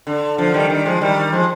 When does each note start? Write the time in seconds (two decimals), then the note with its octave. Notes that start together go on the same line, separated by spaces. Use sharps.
0.07 D3
0.38 D3 F3
0.54 D#3 G3
0.70 D#3 G3
0.85 F3 G#3
1.01 D#3 G3
1.32 F3 G#3